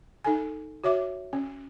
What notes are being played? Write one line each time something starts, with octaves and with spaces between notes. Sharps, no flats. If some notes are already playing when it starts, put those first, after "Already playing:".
D#4 A4 G#5
F#4 C#5 E5 D6
C#4